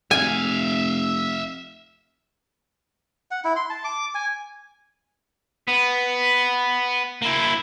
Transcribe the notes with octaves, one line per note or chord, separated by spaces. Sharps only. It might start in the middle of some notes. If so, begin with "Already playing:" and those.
F1 E5 F5 G#5
F#5
E4
C6
A5
D6
G#5
B3
A#3 E4